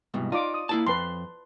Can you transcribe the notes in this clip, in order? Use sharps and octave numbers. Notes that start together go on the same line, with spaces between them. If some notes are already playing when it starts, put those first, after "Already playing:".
C2 G#2 B2
D#4 F4 D5 D6
D#6
A#3 E4 A5
F2 B4 A5 C6